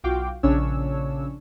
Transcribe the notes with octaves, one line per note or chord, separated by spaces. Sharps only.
B1 F4 F#4 F5 G5 D6
A#1 C#3 C#4 D4 C#5 E6